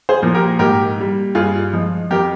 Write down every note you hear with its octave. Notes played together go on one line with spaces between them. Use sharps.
G#4 C5
A#2 F3 A#3
G4 A#4
G#2 G4 A#4
G3 A#3
G2 F4 G#4
F3 G#3
F2 G4 A#4